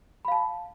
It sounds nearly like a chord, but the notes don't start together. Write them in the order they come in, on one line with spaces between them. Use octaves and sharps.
B5 F5 A5